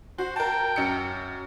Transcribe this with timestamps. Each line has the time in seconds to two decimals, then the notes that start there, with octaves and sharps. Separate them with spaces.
0.18 F#4 C5
0.36 A#4 G5 A5
0.76 F#2 C#7